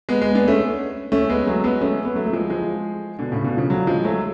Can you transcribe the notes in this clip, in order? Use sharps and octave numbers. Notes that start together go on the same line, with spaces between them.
G#3 B3
G#3 B3
B3 D4
A3 C#4
A3 C#4
G#3 B3
F#3 A3
G#3 B3
A3 C#4
B3
F#3 A3
A3
F3 G#3
F3 G#3
B2 D3
A2 C#3
B2 D3
C#3 F3
D3 F#3
F3 G#3
F#3 A3